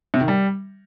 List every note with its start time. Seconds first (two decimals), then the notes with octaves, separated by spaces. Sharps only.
0.14 C3
0.21 D#3
0.28 G3